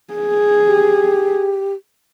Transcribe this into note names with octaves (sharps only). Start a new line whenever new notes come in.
G#4
G4